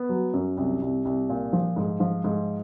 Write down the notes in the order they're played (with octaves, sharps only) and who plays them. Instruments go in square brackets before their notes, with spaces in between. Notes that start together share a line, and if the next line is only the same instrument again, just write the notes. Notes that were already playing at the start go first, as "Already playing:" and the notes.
Already playing: [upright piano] B3
F#3
F#2
C2
C2
C2
A#2
F3
G#2
F3
G#2